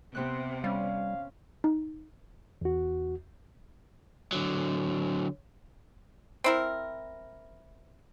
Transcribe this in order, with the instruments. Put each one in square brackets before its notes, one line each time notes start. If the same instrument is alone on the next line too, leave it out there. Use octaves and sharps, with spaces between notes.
[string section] C3 [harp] B3 C4 F#6
[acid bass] G3 [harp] C#4 [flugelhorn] F5
[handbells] D#4
[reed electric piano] E2 F#4
[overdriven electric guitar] D3 F#3
[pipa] C4 E4 A#4